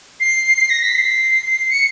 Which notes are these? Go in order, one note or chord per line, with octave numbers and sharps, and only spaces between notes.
C7
C7
A#6
B6
C7
C#7